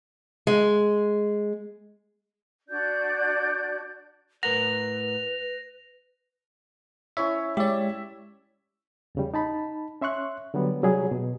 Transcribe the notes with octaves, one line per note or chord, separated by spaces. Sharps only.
G#3
D4 F#4 D5 G6
A2 A#4 B4 F#5 A#6 F7
C#4 E4 C#5 E5
G#3 G4 C#5 D5 E5
E2 C#3 G3
D#4 A5 B5
C#4 E5 C6 C#6 F#6
D3 F#3 G3 B3
C3 F#3 G3 G4 G#4
B2